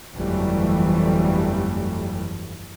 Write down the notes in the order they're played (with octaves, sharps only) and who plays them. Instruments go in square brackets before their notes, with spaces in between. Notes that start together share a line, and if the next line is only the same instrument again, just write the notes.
[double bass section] G1 F2 E3 F#3 G3 A3